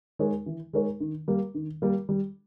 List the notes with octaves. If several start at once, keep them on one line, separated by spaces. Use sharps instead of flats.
G#3 D#4 A#4 C#5
E3
G#3 D#4 A#4 C#5
D#3
G3 A#3
D#3
G3 A#3
G3